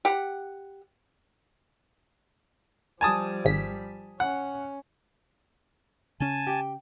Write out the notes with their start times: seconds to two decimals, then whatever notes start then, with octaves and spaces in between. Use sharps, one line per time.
0.05 G4 F#5
3.01 F3 G3 G#5 A5 D#6
3.45 G#1 B6
4.20 C#4 F#5
6.20 C#3 C#4 G#5 A5
6.47 G4